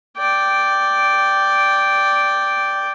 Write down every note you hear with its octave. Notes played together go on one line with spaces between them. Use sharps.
D5 G5